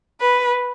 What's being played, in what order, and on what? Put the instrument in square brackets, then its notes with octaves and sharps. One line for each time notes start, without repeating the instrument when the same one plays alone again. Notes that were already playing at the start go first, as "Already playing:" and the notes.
[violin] B4